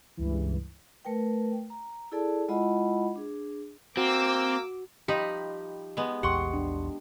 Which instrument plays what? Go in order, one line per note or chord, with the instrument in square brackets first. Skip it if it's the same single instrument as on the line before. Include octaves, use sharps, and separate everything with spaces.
[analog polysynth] C#2 G2 E3
[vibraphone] A3 A#4 B4 G5
A#5
E4 G#4 A4 D5 A5
G#3 E4 F4 D#5 F#5 B5
D4 G#4
[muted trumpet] A#3 [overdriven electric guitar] C4 [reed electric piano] F#4 [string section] D6 E6
[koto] F3 D#4 [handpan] G4 [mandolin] B5
[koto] G#3 B3
[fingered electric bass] A#1 E2 [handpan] G4 [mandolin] F#5 C6 C#6
[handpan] D4